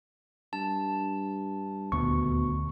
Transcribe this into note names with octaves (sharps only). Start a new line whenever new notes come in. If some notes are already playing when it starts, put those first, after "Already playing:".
G2 A5
D#1 D2 B2 C#6